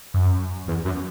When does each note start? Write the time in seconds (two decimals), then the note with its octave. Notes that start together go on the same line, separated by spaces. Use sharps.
0.14 F#2
0.68 E2
0.85 F#2